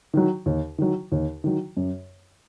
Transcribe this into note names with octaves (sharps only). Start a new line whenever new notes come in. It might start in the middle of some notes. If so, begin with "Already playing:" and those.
D#3 F#3
D#2
D#3 F#3
D#2
D#3 F#3
F#2